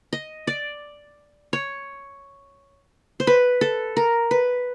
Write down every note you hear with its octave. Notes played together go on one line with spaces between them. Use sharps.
D#5
D5
C#5
C5
B4
A4
A#4
B4